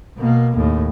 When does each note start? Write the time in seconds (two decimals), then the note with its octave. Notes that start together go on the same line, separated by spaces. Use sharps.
0.18 B2 A#3
0.56 D#2 A2